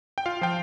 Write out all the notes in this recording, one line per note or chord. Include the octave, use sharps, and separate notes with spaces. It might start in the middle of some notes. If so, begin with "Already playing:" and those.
G5
F4 F5
F3 G5